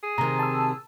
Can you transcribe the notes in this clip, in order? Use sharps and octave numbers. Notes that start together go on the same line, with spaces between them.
G#4
C3 D#3 A#5
A5 E6